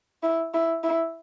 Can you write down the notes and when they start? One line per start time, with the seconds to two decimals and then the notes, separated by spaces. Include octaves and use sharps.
0.23 E4
0.54 E4
0.84 E4